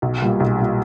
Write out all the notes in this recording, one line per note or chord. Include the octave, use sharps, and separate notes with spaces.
B1
A#2 G3
B1
A#2 G3